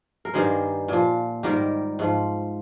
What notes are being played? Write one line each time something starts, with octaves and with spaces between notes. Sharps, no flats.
A#4
G2 D#3 G3 G#4 C5
A#2 F3
G#2 D#3 G3 G4 A#4
G#2 F3